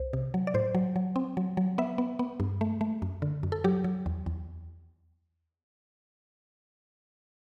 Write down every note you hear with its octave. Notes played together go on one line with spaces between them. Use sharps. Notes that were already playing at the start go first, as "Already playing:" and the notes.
Already playing: C2 C5
C3
F#3
D5
A2 C5
F#3
F#3
C4
F#3
F#3
B3 E5
B3
B3
G2
A3
A3
F#2
D3
F#2
A4
F#3 G4
F#3
E2
E2